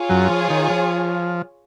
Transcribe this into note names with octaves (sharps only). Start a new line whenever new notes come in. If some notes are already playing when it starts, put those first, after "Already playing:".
Already playing: F4 G#4 C#5 G#5
F#2 F#3
F3
D#3
F3